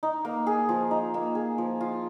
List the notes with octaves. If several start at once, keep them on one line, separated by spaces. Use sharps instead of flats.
D#4
A#3
G#4
F3
D#4
A#3
G#4
F3
F4